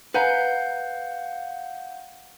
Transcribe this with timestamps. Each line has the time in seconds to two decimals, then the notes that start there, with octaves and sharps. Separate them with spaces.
0.14 B4 F5 F#5 G#5 A#5 G6